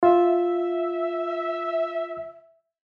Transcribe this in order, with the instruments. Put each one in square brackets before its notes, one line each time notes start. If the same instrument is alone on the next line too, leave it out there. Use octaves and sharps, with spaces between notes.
[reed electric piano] F4 [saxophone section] E5